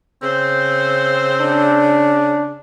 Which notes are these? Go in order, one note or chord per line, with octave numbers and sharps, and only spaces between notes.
C#3 C4 C5
D4